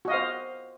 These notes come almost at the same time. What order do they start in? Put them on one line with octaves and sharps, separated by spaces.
F#4 D#5 F5 C5